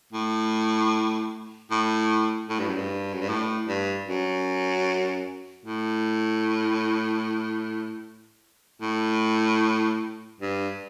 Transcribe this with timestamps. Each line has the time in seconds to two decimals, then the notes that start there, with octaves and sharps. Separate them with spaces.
0.13 A2
1.71 A2
2.49 A2
2.59 G2
2.68 F#2
2.76 G2
3.13 F#2
3.21 G2
3.29 A2
3.68 G2
4.08 F#2
5.65 A2
8.81 A2
10.40 G2